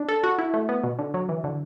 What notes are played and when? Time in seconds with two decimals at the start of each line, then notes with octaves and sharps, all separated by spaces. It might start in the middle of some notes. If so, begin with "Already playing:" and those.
Already playing: D4
0.08 A4
0.24 F#4
0.38 E4
0.54 A3
0.69 B3
0.83 B2
0.99 D3
1.14 F#3
1.29 E3
1.44 D3